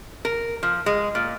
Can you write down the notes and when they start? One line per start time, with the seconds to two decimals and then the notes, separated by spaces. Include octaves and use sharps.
0.25 A#4
0.63 F3
0.86 G#3
1.15 A#2